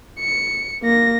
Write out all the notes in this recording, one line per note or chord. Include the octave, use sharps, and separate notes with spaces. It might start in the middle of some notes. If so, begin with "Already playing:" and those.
C#7
A#3 A#6